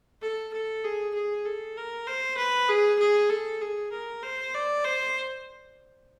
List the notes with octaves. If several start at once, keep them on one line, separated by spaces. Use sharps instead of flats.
A4
A4
G#4
G#4
A4
A#4
C5
B4
G#4
G#4
A4
G#4
A#4
C5
D5
C5